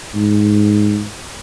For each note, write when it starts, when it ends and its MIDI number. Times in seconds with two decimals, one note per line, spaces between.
0.15 1.05 44